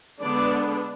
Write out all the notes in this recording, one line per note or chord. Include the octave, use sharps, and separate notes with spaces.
D3 G#3 B3 D4 D5